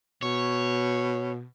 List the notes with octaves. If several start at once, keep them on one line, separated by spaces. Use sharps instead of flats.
B2 C#5